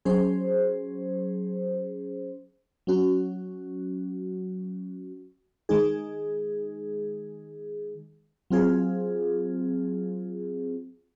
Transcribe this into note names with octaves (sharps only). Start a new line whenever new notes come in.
F#3 C#4 G#4 C5
F#3 C#4 F#4
D#3 G#3 D#4 G#4
F#3 C4 F4 G#4